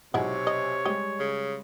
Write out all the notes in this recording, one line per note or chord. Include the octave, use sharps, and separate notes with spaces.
B1 C3 G#3 E4 F#4 C#5 G#5
D#5
G3 G#3 G4 D#5
C#3